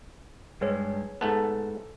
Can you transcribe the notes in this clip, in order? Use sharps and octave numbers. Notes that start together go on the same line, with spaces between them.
G2 G#3 G#4 B4 C#5
G#2 A3 B3 A4 A5